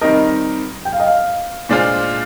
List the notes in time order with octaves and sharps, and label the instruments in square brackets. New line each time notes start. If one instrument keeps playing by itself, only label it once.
[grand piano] D#3 G3 C4 D#4 A#4 [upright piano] D#5
[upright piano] G5
F5
D#5
F5
[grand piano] A#2 G#3 D4 F4 C5